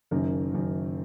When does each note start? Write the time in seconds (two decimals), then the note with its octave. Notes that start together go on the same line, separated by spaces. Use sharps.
0.11 F#1 F#2 D#3 A#4
0.54 F#1 F#2 D#3